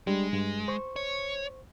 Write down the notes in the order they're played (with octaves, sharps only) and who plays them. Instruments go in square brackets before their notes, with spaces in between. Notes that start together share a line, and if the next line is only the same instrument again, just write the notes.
[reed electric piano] G3 D4 [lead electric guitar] G#3
[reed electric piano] G2
C5 C#6
[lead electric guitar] C#5